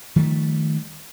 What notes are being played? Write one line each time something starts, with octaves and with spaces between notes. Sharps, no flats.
D#3 F3 G3 A3